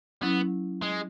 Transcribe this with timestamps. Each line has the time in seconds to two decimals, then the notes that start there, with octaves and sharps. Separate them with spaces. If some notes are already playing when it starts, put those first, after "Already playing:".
0.22 F#3 B3 C#4 E4
0.82 G#3